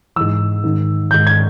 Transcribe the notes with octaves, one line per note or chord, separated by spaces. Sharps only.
G#2 E3 E6
G#2 D#3
G#2 D#3 G6
G#6